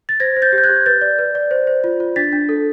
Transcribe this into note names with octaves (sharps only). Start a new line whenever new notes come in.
A6
C5 G#6 A#6
C5
G6 A6
G4
G6
F#6 G#6
G4
B4 G6 A6
D5
B4
D5
C5
C5
F4
F4
D4 A6 B6
D4
A4